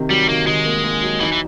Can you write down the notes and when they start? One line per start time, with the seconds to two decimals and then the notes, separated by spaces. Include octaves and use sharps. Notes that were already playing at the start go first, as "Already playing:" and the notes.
Already playing: C3 D#3
0.09 F#3 G3
0.28 D#3 A#3
0.47 D#3 G#3
0.65 A#3
0.84 A#3
1.02 F#3
1.20 E3 D#4
1.32 E3